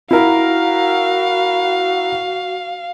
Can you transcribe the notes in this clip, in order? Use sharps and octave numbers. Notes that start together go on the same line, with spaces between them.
E4 F#4 A#4 F5